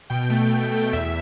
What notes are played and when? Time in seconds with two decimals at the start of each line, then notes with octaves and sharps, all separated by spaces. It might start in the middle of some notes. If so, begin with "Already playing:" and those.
0.10 B2 G5
0.30 A3
0.51 B2 G5
0.72 A3
0.93 E2 E5